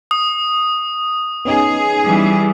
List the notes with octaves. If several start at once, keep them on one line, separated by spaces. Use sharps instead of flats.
D#6
B3 C#4 D#4 G#4
E3 G3